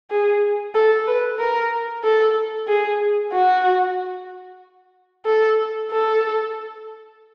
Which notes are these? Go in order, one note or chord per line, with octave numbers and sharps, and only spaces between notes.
G#4
A4
B4
A#4
A4
G#4
F#4
A4
A4